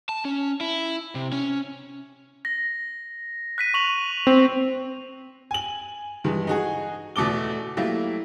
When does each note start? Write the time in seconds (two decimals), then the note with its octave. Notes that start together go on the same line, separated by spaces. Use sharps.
0.09 A5
0.25 C#4
0.61 E4
1.15 C3
1.32 C#4
2.45 A#6
3.58 F#6 B6 D#7
3.74 C#6 F7 F#7
4.27 C4
5.51 G#5 F#7
6.24 G2 D#3 E3 G#3
6.47 D#4 F#4 G#4
7.16 E2 B2 A3 A4 D6 G7
7.77 F#3 A3 A#3 E4 G4